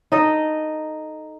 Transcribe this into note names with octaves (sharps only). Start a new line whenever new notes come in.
D#4 A4 D#5